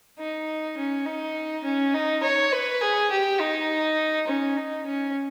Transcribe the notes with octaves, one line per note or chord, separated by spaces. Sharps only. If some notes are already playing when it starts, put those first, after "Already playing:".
D#4
C#4
D#4
C#4
D#4
C#5
B4
G#4
G4
D#4
C#4
D#4
C#4